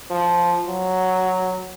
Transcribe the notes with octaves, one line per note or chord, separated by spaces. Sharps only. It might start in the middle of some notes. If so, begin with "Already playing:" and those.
F3
F#3